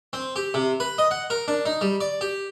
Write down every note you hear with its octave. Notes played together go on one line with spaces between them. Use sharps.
C4
G4
C3
B4
D#5
F#5
A#4
D4
D#4
G3
D5
G4